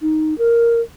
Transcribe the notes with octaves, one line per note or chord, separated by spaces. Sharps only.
D#4
A#4